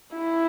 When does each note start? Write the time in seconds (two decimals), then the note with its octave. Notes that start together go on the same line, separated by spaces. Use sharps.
0.16 E4